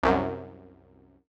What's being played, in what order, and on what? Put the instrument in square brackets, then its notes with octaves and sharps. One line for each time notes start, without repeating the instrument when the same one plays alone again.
[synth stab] C2 F#2